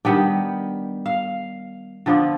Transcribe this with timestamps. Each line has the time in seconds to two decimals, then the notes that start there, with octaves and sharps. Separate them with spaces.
0.05 D#3 G3 B3 D4 G5
1.06 F5
2.06 D3 F3 B3 D4